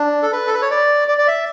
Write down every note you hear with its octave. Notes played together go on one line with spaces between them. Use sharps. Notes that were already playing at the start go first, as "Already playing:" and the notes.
Already playing: D4
A4
B4
A4
B4
C#5
D5
D5
D5
E5